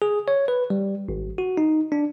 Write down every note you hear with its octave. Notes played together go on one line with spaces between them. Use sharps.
G#4
C#5
B4
G3
G#1
F#4
D#4
D4